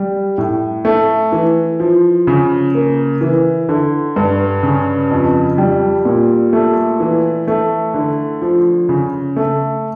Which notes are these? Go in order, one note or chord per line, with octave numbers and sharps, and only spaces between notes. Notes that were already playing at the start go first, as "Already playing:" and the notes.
Already playing: G3
A2
A3
E3
F3
C#3
A#3
E3
D3
G2
C#3
F2
G3
A#2
A3
E3
A3
D3
F3
C#3
A3